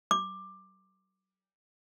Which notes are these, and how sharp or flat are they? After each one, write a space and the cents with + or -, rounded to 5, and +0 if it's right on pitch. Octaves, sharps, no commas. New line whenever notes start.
D6 +10